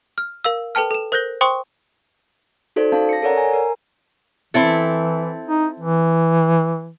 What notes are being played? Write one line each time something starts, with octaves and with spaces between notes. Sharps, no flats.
F6
A#4 F5 E6
A4 B4 G5 A5 F6
A4 E7
A#4 C5 F#6 G6 A#6 G7
C5 G5 C6 C#6 D#6
D#4 F#4 A4 C5 D5
C#4 F5 A5
A#6 C#7
A4 A#4 C#5 D5 F#5 A#5
G#5 A#5
A#4
E3 C4 E4 A4
D#4
E3